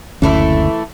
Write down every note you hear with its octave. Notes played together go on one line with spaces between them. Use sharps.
F#1 D2 E3 A3 C#4 E4